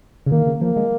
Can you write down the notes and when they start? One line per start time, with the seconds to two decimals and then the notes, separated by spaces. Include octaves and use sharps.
0.26 C#3
0.31 D#3 A#3
0.47 C#3
0.61 F3 A#3
0.76 G#3